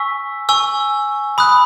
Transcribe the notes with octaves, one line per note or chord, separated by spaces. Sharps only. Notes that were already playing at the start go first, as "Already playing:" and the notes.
Already playing: G#5 C#6 E6 B6
G#5 C#6 E6
B5 D#6 F#6